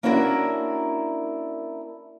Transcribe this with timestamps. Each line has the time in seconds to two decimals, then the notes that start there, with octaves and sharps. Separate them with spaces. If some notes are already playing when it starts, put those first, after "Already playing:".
0.03 A#3 C#4 D4 E4 F#4 A#4